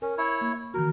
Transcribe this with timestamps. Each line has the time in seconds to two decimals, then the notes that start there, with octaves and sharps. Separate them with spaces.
0.02 C#4 A#4
0.18 E4 C#5
0.41 A#3
0.74 D#3 E3 F#4 A#4